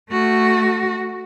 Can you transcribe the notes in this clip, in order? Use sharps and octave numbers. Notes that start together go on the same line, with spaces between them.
A3 F#4